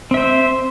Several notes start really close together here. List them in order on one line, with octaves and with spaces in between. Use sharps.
C4 E5 C5